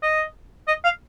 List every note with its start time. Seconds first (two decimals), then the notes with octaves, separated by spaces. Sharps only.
0.03 D#5
0.68 D#5
0.84 F5